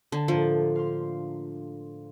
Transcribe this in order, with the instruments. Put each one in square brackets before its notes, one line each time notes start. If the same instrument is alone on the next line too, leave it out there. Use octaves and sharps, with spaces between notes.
[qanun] D3 [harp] A5
[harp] A2 A#3 D4 [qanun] F3
[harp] F5 C6